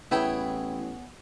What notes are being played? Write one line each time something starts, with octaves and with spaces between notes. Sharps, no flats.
A1 B3 E4 G#4 C#5 G5